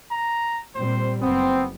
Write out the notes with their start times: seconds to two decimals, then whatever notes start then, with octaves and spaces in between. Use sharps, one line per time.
0.11 A#5
0.75 A#2 G3 C4 C5
1.22 F#1 B3 C4